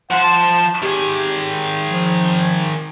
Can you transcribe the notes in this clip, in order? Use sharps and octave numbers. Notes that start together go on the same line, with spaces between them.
F3 C5 F#5
A5
D#3 G4 G#4
F3